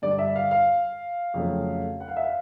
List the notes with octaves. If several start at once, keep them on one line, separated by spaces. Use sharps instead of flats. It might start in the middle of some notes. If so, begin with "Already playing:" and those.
G2 D3 G3 D5
E5
F5
F5
F2 C#3 F#3 A3
F#5
F5
E5
F5